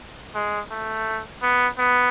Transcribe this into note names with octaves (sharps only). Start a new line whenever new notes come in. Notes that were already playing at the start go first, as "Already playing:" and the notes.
G#3
A3
B3
B3